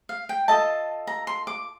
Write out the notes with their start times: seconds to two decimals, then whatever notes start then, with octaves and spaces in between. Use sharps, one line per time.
0.09 F5
0.29 G5
0.48 F4 A4 D#5 A5
1.07 A#5
1.27 C6
1.47 D6